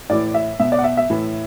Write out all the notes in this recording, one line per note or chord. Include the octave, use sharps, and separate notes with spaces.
A2 E3 D5
E5
B2 E5
D5
F#5
E5
E5
A2 E3